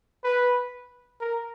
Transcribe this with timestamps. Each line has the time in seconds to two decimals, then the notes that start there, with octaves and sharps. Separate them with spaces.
0.24 B4
1.21 A#4